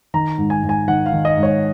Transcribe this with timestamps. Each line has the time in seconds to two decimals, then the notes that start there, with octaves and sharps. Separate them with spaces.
0.14 D#3 A#5
0.38 G#2
0.50 G#5
0.63 G#2
0.69 G#5
0.88 D#3 F#5
1.06 F5
1.12 D#3
1.25 D#5
1.37 G#2
1.43 C#5